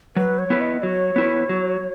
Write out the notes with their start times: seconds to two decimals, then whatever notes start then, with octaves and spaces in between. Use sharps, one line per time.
0.16 F#3 B4
0.39 C#5
0.50 B3 E4 B4
0.61 D#5
0.82 F#3 C#5
1.16 B3 E4 B4
1.49 F#3